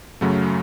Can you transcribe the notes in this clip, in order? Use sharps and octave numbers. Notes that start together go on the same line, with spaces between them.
F#2 C#3 F#3 A3